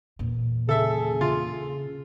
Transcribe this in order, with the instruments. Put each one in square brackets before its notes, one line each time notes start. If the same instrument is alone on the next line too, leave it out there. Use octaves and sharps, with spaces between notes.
[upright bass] E2 A#2
[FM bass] C#3 [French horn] G#4 [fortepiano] A4 E5
[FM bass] C#3 [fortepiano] F4